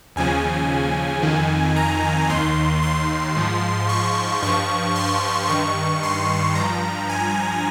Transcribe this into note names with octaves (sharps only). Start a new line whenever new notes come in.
D#2 C#3 F3 G#5
F2 D#3
A#5
D#2 D#3 C6
C6
G#2 F3
C#6
G2 F3 C#6
C6
G2 D#3 C#6
C6
G2 F3 A#5
G#5